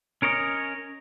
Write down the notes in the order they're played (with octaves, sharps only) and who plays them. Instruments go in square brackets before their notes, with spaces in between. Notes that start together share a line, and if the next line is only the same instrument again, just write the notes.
[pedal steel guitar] C#4 A#4 C#5 D#5